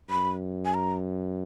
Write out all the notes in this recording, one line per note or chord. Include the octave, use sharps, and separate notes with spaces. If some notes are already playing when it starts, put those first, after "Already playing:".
F#2 B5
G#5
A#5